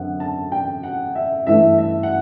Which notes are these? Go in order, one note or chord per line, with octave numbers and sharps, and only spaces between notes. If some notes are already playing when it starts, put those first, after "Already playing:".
Already playing: F#2 D3 F#3 C4 F#5
A5
G5
F#5
E5
G2 E3 A3 E4 E5
E5
F#5